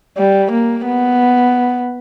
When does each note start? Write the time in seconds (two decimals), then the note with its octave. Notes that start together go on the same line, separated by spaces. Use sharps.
0.17 G3
0.52 A#3
0.86 B3